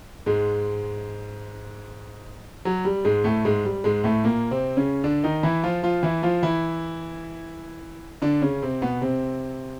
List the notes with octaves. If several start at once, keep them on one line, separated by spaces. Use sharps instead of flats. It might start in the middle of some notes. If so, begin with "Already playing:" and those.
G#2 G#3
F#3
G3
G#2 G#3
A2 A3
G#2 G#3
G3
G#2 G#3
A2 A3
A#2 A#3
C3 C4
C#3 C#4
D3 D4
D#3 D#4
E3 E4
F3 F4
F3 F4
E3 E4
F3 F4
E3 E4
D3 D4
C#3 C#4
C3 C4
B2 B3
C3 C4